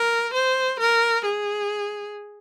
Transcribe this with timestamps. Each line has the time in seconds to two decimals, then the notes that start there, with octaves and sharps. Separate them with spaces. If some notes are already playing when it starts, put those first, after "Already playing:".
Already playing: A#4
0.34 C5
0.80 A#4
1.25 G#4